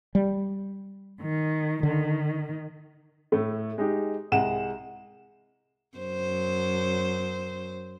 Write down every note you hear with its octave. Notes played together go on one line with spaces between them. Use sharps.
G3
D#3
D3 D#3
A2 A3
G#3 D#4 G4
C2 G#3 F#5 E7
F#2 C5